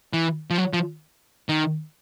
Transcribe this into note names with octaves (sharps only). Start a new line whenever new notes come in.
E3
F3
F#3
F3
D#3